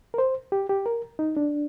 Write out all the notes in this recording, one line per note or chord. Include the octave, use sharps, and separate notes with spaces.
A#4
C5
G4
G4
A#4
D#4
D4